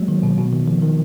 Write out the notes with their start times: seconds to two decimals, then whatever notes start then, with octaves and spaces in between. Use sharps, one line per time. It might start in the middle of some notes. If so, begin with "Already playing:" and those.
Already playing: F#3 G#3 A#3
0.08 D#3
0.23 B2
0.38 B2
0.53 D#3
0.68 F3
0.82 D#3